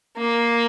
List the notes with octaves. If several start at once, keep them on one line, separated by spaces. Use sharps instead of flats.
A#3